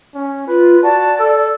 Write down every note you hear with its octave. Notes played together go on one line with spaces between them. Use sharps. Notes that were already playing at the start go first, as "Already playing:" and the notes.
C#4
F4 B4
F#4 D5 A5
A4 E6